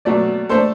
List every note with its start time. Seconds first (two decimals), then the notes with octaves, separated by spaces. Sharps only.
0.05 B2 F#3 A3 D5
0.49 A3 D4 A4 C5